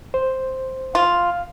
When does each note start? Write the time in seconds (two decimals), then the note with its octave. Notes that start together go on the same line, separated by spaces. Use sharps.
0.14 C5
0.95 F4 F5